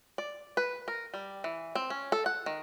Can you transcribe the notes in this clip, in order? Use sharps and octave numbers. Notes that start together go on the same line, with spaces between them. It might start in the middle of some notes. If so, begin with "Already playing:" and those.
D5
B4
A#4
G3
E3
C4
C#4
A4
F#5
D#3